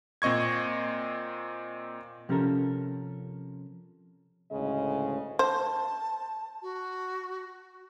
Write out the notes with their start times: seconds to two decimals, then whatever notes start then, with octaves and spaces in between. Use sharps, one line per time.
0.22 A#2 C4 D#5 C#6 G#6
2.29 C3 F3 C#4 G4 A4 A#4
4.51 D2 A2 C#3 G#3 D#5
5.39 C5 A5
6.62 F#4